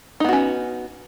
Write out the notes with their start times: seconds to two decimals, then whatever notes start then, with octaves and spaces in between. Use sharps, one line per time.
0.20 D#4
0.24 B3
0.29 F#4
0.33 C#4